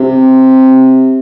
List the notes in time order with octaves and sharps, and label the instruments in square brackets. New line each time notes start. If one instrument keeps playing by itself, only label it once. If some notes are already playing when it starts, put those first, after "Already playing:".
Already playing: [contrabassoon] C3